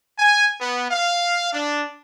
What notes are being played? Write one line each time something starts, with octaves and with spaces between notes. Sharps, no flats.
G#5
B3
F5
D4